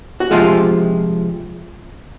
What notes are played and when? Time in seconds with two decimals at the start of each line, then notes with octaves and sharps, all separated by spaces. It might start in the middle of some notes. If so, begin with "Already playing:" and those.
0.20 F#4
0.31 C3 F3 G#3 F4 G#4